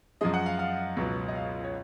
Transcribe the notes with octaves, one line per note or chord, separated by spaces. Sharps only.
F#2 F3 G#3 D#5
F#5
F5
F5
C#2 B2 F#3
D#5
F5
C#5